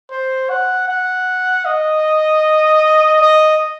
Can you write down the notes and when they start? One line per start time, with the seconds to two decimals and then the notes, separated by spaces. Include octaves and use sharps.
0.10 C5
0.50 F#5
0.88 F#5
1.65 D#5
3.21 D#5